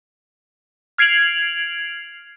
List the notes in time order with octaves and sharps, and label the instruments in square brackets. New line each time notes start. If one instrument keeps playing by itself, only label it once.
[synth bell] F6 G#6 C7 D7 F7 F#7